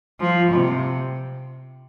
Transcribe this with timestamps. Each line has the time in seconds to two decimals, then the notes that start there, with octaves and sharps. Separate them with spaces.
0.20 F3
0.52 C3